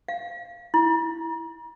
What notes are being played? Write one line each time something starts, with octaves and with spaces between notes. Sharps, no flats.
F5
E4